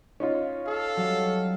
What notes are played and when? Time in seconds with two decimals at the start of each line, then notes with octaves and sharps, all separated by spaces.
0.20 C#4 D#4 F4
0.65 A4 F5
0.97 F#3 G3